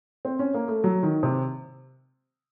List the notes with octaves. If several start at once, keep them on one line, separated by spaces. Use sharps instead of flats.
C4
C#4
A#3
A3
F#3
D#3
C3